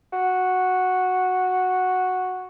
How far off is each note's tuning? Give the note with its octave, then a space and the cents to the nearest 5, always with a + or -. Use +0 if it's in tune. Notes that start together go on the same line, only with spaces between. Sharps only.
F#4 -5